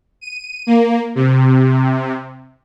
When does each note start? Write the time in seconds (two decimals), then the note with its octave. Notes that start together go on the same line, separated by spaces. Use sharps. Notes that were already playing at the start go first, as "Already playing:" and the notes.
0.21 D#7
0.67 A#3
1.15 C3